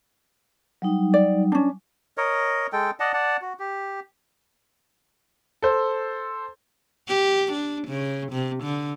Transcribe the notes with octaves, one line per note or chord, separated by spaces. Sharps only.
F#3 G3 D#4
D5
C#4 D4
A#4 C#5 D#5
G#3 A4 G5
D5 D#5 F#5 A5
D5 F#5 A5
F#4
G4
A4 C5
G4
D4
C#3
C3
D3